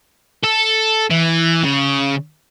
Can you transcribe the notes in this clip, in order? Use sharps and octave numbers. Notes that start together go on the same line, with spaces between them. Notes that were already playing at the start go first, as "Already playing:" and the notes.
A4
E3
C#3